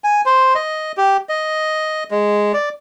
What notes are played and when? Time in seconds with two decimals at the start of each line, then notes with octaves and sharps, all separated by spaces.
0.04 G#5
0.26 C5
0.55 D#5
0.97 G4
1.29 D#5
2.11 G#3
2.54 D5